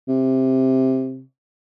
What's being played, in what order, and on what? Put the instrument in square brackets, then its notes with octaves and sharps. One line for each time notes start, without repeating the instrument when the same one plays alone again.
[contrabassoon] C3